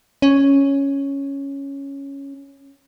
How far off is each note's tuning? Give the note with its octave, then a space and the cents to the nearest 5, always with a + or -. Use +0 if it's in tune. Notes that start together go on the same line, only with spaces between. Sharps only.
C#4 +0